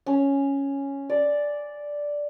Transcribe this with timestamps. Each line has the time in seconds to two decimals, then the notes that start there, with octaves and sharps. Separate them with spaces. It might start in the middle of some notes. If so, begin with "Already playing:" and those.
0.06 C#4
1.10 D5